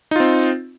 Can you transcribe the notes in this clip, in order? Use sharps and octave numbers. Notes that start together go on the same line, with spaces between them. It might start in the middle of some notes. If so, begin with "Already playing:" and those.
C4 D#4 F4